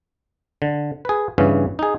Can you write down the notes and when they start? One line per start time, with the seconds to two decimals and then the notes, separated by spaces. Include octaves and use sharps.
0.62 D3
1.05 G#4 B4
1.38 G2 C#3 E3 B3 C#4
1.79 D#4 G#4